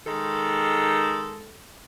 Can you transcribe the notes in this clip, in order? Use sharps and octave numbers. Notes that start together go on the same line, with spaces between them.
D#3 G#3 A4